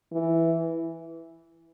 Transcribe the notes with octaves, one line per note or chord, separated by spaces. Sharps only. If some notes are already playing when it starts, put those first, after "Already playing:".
E3